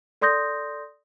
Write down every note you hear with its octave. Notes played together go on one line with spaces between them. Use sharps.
A4 D5 C6 D#6 G6 A#6